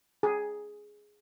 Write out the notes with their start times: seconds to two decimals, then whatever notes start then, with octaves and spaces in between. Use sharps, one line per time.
0.23 G#4